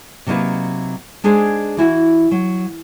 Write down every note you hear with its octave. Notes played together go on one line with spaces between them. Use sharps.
C3 F#3 A#3 D#4 B4
G#3 D4 D#4 G#4 C5
E3 E4 F#4
F#3